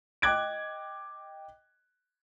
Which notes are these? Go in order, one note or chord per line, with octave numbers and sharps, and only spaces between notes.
D#5 G5 D6 F#6 G#6 D7